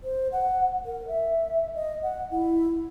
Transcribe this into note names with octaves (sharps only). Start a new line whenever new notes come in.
C5
F#5
A#4
E5
D#5
F#5
E4